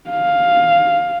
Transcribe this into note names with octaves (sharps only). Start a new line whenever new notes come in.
F5